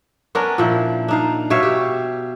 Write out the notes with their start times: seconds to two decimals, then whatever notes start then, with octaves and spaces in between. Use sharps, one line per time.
0.35 B3 C#4 D4 A#4
0.58 A#2 F3 E4
1.08 D4 D#4 F5
1.50 B2 C#5 E5 F5
1.63 G4